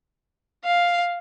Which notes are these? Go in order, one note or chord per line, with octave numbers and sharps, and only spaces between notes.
F5